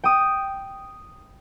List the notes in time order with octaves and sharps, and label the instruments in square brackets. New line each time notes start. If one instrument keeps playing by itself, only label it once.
[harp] G5 D#6